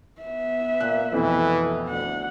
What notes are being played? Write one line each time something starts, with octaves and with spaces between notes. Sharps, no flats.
B3 E5
A#2 F#6
F2 B2 E3 A3
D2 F#5